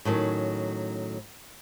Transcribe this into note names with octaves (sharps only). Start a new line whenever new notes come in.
A2 D#3 F#3 C#4